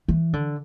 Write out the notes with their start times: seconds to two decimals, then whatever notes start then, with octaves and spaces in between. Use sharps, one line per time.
0.08 E3
0.33 D3